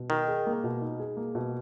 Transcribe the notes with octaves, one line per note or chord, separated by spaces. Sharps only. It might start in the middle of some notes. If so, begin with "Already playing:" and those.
Already playing: B2
D#3 D#4
G#4
A#3
B2
D#4
G#4
A#3
B2